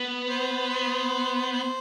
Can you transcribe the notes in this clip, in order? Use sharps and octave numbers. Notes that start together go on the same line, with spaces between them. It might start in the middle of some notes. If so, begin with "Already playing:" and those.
Already playing: B3
C5
C5
C5